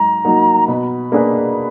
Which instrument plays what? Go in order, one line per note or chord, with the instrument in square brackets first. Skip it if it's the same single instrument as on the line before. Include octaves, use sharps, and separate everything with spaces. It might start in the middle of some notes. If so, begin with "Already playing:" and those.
Already playing: [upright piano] G#2 F#3 [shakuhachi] A#5
[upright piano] F#3 A#3 D#4 F#4
[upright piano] B2 [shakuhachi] B5
[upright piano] A#3 D4 G#4 B4